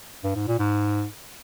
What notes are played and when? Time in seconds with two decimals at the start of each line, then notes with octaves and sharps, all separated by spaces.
0.24 G2
0.36 G#2
0.47 A#2
0.59 G#2